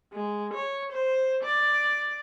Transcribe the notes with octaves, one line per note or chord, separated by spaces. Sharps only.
G#3
C#5
C5
D5